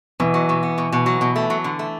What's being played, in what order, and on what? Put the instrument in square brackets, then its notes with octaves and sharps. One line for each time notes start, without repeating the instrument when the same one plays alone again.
[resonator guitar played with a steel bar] B2 [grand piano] E3
[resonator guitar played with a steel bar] F#3
B2
B3
B2
B2
F#3
B2
A3
F#3
D3
A3